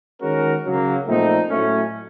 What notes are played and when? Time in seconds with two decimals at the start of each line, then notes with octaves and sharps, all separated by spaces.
0.21 D#3 G#3 C#4 F#4 A#4
0.64 C#3 F#3 A#3
1.07 A#2 F3 A3 C4 D#4
1.49 A2 F#3 A3 C#4